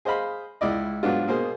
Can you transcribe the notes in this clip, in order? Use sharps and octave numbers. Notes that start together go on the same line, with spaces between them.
G#4 C5 D#5 F5 B5
C#2 E4 D5 D#5
G#2 F#3 B3 D4 F4
B2 A#3 G#4 C5